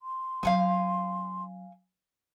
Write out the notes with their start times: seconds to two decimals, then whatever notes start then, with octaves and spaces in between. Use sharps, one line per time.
0.02 C6
0.43 F#3 C#4 F5 F#5 G#5